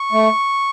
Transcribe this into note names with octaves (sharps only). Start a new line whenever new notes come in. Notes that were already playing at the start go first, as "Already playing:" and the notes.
Already playing: C#6
A3